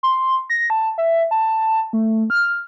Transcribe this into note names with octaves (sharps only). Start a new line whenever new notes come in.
C6
A#6
A5
E5
A5
A3
F6